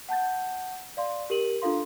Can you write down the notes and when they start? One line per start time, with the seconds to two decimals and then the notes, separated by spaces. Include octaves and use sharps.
0.09 F#5 A5 G6 A6
0.97 D5 F5 C6
1.30 G4 A#4 D#7 F#7
1.62 D4 F4 A4 F5 C6